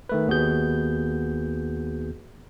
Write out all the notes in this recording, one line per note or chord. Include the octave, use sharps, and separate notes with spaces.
D#3 A3 B4
D#2 B3 F#4 G#4 G6